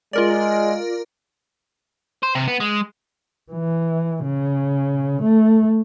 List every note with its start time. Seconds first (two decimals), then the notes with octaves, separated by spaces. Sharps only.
0.13 G#3 F4 A#4 D5
2.23 C5
2.35 C3
2.48 B3
2.60 G#3
3.52 E3
4.24 C#3
5.23 A3